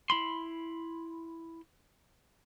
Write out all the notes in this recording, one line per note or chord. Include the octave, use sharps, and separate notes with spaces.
E4 B5 C6